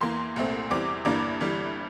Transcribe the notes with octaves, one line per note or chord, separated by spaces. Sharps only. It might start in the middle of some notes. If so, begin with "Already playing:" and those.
E2 E3 A#3 C6
C2 A#2 A3 C4
E2 E3 G3 C4 D6
G1 G2 E3 A#3 D4 D6
G1 G2 E3 G3